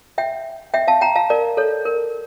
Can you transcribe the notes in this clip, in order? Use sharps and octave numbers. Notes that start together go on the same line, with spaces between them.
E5 G5
E5 G5
F5 A5
G5 A#5
F5 A5
A#4 D5
A4 C#5
A#4